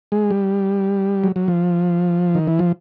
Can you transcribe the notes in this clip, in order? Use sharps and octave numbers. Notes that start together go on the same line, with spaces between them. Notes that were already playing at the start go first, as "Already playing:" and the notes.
G#3
G3
F#3
F#3
F3
D#3
E3
F3